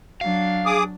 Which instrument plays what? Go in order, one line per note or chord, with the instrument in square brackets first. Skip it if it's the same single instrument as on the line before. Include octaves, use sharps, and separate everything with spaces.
[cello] F#3 D4 [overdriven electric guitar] F5
[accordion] G#4 D6 D#6